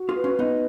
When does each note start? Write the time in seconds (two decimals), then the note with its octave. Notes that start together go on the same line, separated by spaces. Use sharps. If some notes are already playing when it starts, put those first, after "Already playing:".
Already playing: F#4
0.09 F4 G#4
0.16 B4
0.24 C#4 F4
0.39 B3 D#4 D#5